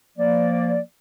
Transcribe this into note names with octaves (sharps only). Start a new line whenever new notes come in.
F3 A#3 D5